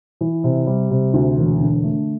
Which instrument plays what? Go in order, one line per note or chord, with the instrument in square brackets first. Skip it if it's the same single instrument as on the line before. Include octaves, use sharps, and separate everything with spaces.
[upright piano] E3
C3
G3
C3
D2
E1
D3
A3